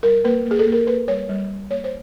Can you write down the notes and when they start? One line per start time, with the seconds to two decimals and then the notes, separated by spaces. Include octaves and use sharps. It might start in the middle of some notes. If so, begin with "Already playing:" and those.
0.03 G3 A#4
0.24 A#3 B4
0.46 A#3
0.51 G#4
0.59 A4
0.66 A#3
0.72 A#4
0.87 A#3 B4
1.08 G3 C#5
1.29 G3
1.50 G3
1.70 A#3 C#5
1.84 C5